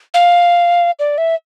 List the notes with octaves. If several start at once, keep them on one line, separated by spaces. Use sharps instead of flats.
F5
D5
E5